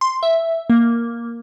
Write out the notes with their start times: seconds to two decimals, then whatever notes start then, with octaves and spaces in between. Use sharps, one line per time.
0.01 C6
0.23 E5
0.70 A#3